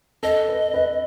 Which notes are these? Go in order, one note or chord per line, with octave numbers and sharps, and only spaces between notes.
A4 D#5
B4
B4